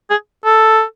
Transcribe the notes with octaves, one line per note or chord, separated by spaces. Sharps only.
G#4
A4